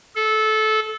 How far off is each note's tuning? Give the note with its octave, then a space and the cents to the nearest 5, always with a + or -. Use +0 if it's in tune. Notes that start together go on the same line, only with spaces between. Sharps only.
A4 -20